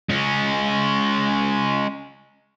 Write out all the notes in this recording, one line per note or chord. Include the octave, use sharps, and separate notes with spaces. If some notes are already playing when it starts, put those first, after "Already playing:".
G#3 C#4